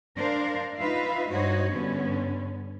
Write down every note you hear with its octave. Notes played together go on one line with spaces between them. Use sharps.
D4 A#4 C5 D5 F5
D#4 F4 B4 E5 F5
G2 D#4 F#4 C5 C#5
G2 D3 B3 C#4